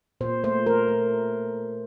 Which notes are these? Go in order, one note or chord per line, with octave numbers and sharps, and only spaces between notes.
A#2 C5
A3 C5
A3 A#4
A3